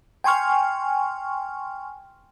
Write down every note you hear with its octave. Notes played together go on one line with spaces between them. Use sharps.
G5 G#5 C6 C#6 F6